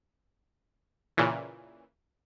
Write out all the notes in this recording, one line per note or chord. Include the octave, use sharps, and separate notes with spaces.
A#2 C#3 E3